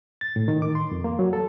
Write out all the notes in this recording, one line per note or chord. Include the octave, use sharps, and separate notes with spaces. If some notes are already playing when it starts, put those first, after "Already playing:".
A6
A2
D#3
D6
C6
F2
A#3
F#3
A4